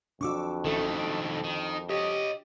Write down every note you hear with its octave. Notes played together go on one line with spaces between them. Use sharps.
F2 D4 F#4 C#6 D6 E6
A1 D#3 A3 A4
D7
D#3
G4 C#5 D#5